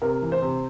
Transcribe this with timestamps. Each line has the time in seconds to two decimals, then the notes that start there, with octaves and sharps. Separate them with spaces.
0.02 C3 A#4
0.22 E3
0.32 C5
0.42 C3